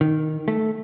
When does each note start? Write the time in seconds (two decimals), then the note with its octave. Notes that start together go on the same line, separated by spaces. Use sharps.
0.01 D#3
0.48 A3